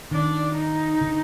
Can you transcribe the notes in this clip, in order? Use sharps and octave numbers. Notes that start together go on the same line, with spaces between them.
D#3 D4
D#4
D3